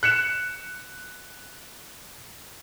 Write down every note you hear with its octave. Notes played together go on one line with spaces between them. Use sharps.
F#6 C#7 E7